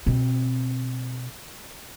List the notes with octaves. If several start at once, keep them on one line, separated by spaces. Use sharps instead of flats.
B2 C4